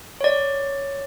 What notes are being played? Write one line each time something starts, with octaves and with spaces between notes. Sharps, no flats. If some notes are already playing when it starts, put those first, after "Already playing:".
C#5 D5